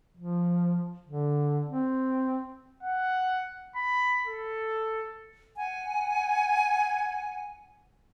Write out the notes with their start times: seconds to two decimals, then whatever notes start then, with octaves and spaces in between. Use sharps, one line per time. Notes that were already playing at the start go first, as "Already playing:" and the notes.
0.17 F3
1.06 D3
1.66 C4
2.83 F#5
3.75 B5
4.26 A4
5.57 F#5 G#5